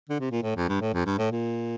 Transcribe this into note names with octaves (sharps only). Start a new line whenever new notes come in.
D3
C3
A#2
A2
F2
G2
A2
F2
G2
A2
A#2